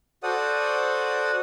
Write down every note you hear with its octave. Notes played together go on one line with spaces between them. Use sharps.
F#4 A4 C5 D5 F#5 D#6